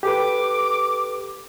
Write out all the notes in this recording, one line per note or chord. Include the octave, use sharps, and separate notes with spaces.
G4 A4 B4 D6